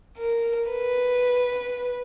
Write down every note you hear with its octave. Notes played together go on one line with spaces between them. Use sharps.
A#4
B4